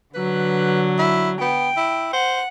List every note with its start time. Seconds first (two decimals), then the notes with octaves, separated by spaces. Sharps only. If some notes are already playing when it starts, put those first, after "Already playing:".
0.14 D3 F#3 B4
0.98 E4
1.41 B3 G5
1.77 E4
2.13 C5 F#5